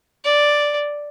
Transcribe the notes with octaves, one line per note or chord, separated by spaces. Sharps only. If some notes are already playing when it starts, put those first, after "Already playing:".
D5